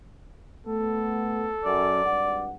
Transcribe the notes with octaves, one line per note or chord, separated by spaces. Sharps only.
A3 B3 A4
F#2 D5
G#1 G2 F#5